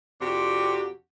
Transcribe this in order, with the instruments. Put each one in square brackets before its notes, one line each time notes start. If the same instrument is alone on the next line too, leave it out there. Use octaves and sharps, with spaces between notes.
[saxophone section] F2 C3 D4 F#4 G4